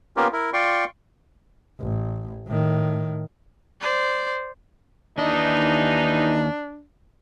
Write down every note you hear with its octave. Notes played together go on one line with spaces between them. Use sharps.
A#3 B3 C#4 F4 G4 A#4
E4 A#4
F4 D5 G5 C6 C#6
A1
A2 D#3
C5 D5
D#2 E3 D4 D#4 D#5